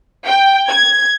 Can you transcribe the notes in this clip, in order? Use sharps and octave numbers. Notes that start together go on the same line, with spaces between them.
G5
G#6